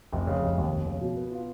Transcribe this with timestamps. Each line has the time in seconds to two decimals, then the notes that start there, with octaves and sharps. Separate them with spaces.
0.12 F1
0.27 C#3
0.43 F1
0.58 D#2
0.71 F1
0.87 C#3
1.01 B2
1.16 B3
1.31 F4